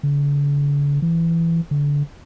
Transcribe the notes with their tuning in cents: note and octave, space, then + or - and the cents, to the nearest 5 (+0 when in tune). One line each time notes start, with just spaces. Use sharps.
D3 -45
E3 +15
D3 -25